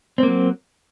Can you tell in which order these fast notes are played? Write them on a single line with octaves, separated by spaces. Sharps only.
C4 A#3 F#3